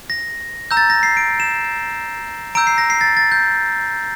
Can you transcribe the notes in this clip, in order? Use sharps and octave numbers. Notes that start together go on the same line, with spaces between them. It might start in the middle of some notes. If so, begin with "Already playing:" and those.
A#6
A#5 E6 G6
A6
A#6
C7
D7
E7
A#5 E6 G6 D7
C7
A#6
C7
A6
A6
G6